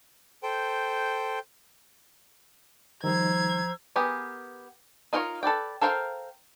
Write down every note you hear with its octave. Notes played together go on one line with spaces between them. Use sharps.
A4 C5 G5
D#3 F3 G3 D#4 C5 A#5 E6 G#6
B3 G4 G#4 A#4
D#4 F4 A#4 C5 C#5
A4 B4 D5 G5
A4 A#4 C5 F5 G5